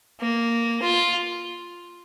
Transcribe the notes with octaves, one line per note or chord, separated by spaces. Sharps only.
A#3
F4